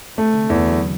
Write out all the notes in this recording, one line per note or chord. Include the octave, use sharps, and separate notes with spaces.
C3 A3
D3
E2 E3
E3
F#3